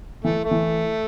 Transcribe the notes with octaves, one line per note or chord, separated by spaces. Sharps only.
E3 A3
A3
E3